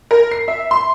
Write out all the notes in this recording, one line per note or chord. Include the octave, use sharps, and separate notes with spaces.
A#4
C7
E5
C6